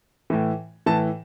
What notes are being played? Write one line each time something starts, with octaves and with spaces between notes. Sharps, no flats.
A2 E3
A2 E3 A5